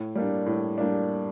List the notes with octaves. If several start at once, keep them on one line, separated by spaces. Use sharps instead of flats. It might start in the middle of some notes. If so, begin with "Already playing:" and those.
Already playing: A2
G3 A#3 D4
A2
G3 A#3 D4